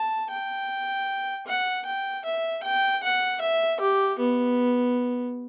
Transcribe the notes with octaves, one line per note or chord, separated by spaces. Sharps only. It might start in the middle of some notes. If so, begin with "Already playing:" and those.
Already playing: A5
G5
F#5
G5
E5
G5
F#5
E5
G4
B3